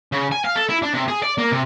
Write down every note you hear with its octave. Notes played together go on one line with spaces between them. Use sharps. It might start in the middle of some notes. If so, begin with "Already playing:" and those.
C#3
G#5
F5
A4
E4
D4
C3
G#4
D5
A#3
C3